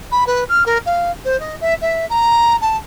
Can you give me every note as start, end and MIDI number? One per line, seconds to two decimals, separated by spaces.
0.12 0.24 83
0.27 0.44 71
0.49 0.64 89
0.66 0.78 70
0.86 1.11 77
1.25 1.39 72
1.40 1.56 75
1.61 1.74 76
1.82 2.06 76
2.10 2.56 82
2.61 2.77 81